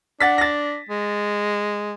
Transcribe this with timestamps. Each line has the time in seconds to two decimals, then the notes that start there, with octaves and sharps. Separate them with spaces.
0.20 D4 F#5 A6 B6
0.38 A6 A#6
0.89 G#3